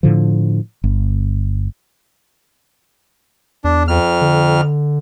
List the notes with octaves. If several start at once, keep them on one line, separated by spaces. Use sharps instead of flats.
A2 D3 F3
G1
E2 D4
F2 F6
D3